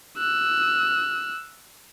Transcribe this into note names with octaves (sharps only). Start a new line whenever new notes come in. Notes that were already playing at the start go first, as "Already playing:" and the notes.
E6 F#6